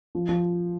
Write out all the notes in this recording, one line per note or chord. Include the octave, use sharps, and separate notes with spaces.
F3
F3